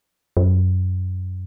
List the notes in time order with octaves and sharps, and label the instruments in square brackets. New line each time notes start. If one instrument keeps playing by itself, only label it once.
[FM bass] F#2